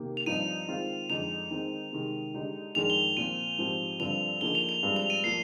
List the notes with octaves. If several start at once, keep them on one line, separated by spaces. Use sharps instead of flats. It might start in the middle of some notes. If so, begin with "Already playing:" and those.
Already playing: C3 D#3 A#3 G4
F7
G2 F3 C4 D#4 D#7
D#3 G#3 C4 F4
F2 D3 G#3 D#4 F7
D#3 G#3 C4 D#4
C3 D#3 G#3
D3 G#3 D#4 G4
F2 D#3 G#3 D4 G#4 F7
G7
A#2 F3 C4 D#7
G#2 F3 C4 G4
G2 D3 F3 C4 F7
D3 F3 A#3 D#4 G#4 G7
F7
F7
G2 F3 G#3 C4 G4
F7
D#7
A#2 F3 A#3 C7